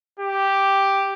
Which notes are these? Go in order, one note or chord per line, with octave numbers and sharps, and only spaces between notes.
G4